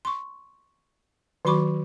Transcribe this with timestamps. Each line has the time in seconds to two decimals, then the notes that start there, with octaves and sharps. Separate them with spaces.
0.05 C6 C#6
1.45 D#3 F#3 F#4 B5 C#6 D6